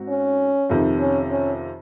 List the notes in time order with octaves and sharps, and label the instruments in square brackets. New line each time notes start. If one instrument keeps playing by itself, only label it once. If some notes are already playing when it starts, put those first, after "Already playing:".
Already playing: [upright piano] G#2 C4 F#4
[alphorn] C#4
[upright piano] F2 C3 D#3
[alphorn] C#4
C#4